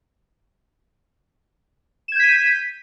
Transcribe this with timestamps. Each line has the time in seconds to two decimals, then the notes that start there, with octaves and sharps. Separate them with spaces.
2.08 E7
2.12 G#6
2.16 G6
2.19 B6
2.23 D#7